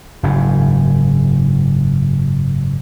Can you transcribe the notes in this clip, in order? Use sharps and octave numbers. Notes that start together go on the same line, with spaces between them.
F#1 G#2